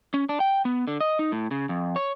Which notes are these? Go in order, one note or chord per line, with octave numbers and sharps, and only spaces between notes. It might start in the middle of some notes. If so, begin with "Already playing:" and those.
C#4
D4
G5
B3
D3
D#5
D#4
A2
C#3
F2
C#5